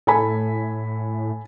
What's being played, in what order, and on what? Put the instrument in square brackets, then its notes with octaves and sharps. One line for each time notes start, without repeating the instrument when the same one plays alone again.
[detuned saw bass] A2 [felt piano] A4 G#5 B5